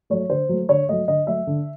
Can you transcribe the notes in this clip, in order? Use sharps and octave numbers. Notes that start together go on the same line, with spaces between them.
F#3 A3 C#5
D3 C5
F#3 A3
D3 C#5
F#3 A3 D#5
D3 D#5
F#3 A3 E5
D3